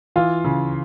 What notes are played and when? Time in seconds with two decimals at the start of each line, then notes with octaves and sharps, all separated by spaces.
0.16 E3 F4 F5
0.44 C#3